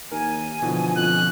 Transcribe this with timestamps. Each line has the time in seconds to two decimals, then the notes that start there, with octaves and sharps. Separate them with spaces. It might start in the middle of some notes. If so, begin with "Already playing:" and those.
0.12 D#2 A#4 G#5
0.62 B2 D3 E3 F3
0.96 F2 F#6